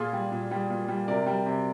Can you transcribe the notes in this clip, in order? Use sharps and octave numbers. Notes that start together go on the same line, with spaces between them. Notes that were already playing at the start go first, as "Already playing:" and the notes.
Already playing: A#2 F4 G#4
G3
A#2
G3
A#2
G3
C3 A#4 D5
G3
C3